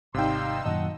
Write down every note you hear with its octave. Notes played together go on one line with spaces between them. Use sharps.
G#1 C3 G3 D#4 F5 G5 C6 E6
F#2 A#2 D#3 F#4 D#5 F#5 A5